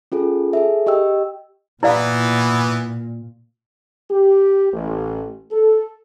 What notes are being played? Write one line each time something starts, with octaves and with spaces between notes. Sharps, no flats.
C#4 F4 G#4 A4
G#4 A4 E5
G4 D#5 G5 E6
A#2 E3 B3 E4 D5 F5
G4
A1
A4